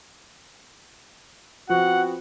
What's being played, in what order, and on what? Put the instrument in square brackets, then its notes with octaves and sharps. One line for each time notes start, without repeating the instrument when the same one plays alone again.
[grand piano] F3 [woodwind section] B3 C4 F#4 [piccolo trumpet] F#5